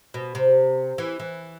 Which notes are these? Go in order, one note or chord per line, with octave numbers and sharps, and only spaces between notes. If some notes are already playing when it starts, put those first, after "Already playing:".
B2
C3
E3
E3